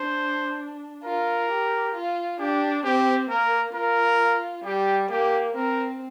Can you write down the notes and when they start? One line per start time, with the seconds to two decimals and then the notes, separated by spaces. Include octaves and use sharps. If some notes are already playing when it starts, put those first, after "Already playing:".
Already playing: D4 C5
1.04 F4 A#4
1.49 G4
1.94 F4
2.39 D4 G4
2.84 C4 G4
3.30 A#3 A#4
3.74 F4 A#4
4.65 G3 G4
5.10 A#3 G4
5.55 C4 A#4